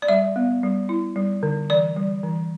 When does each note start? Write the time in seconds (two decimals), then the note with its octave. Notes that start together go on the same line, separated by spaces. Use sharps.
0.02 D5
0.08 G3 E5
0.36 B3
0.63 G3
0.89 E4
1.16 G3
1.43 D3
1.70 E3 D5
1.96 G3
2.23 E3